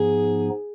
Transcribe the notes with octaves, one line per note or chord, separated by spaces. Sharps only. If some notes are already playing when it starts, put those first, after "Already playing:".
Already playing: G#2 F3 B3 D#4 G#4